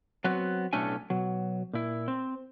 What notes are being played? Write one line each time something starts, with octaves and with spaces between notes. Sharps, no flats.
F#3 B3 C4 F#4
B1 A2 A3 C#4 D4 G#5
B2 F#3
A#2 E4
C4